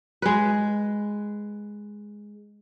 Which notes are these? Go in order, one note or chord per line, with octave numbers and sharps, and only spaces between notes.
G#3 B4